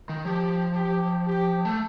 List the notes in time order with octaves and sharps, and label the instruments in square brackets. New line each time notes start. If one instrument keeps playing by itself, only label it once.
[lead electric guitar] D#3
[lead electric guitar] F3 [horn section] G4
[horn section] G4
G4
[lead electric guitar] A3